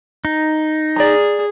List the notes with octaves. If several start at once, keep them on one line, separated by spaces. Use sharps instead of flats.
D#4
G#4 D5 A#5